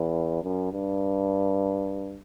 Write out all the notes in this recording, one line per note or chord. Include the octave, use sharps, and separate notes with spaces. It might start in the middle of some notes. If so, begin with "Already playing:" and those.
Already playing: E2
F#2
G2